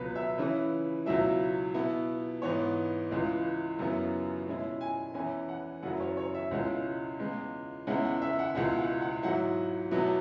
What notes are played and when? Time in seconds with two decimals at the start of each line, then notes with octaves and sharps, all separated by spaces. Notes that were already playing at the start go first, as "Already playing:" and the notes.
Already playing: C#2 B2 F#3 B3 B4
0.15 E5
0.38 C#3 E3 C#4 E4 B4
1.06 C#2 B2 F#3 E4 E5
1.74 B2 B3 E4
2.42 G#2 E3 B3 C#5
3.11 C#2 C#3 E3 G#3
3.79 F#2 C#3 F#3 B3 E4
4.47 B2 G#3 C#4 E4
4.81 G#5
5.14 E2 E3 C#4 E4 G#5
5.49 F#5
5.83 F#2 C#3 F#3 C#4 E4 F#5
6.00 C#5
6.17 C#5
6.34 E5
6.51 C#2 B2 G#3 C#4 E4 F#5
7.19 E2 C#3 G#3
7.87 E2 C#3 G#3 C#4 E4 F#5
8.05 F#5
8.22 E5
8.39 F#5
8.55 C#2 B2 G#3 E4 F#5
8.78 F#5
9.01 F#5
9.23 G#2 F#3 E4 F#5
9.91 E2 B2 F#3 B3 E4